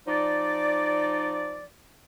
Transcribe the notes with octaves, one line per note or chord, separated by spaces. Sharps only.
F3 D#4 D5